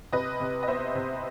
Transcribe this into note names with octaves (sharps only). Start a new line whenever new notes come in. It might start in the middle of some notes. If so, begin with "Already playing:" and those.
C3 B4 D#5
C3
D#5
B3 C5 E5
C3